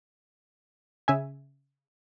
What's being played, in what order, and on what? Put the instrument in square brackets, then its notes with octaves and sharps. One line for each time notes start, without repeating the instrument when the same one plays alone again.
[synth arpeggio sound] C#3 E5 G#5